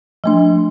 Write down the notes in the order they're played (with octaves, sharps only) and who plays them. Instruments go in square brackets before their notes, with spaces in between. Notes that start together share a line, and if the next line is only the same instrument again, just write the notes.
[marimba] F3 A3 D4